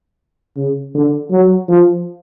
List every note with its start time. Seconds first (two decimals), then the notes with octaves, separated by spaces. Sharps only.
0.57 C#3
0.95 D3
1.31 F#3
1.69 F3